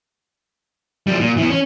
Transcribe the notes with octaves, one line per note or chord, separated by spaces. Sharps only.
F3 G3
A#2
E3 B3
C#4